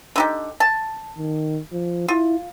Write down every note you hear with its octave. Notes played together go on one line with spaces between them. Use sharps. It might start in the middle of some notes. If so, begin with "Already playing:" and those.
D3 D#4 G4
A5
D#3
F3
E4 F4